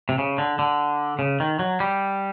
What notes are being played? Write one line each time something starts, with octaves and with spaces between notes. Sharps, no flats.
C3
C#3
D3
D3
C#3
D#3
F#3
G3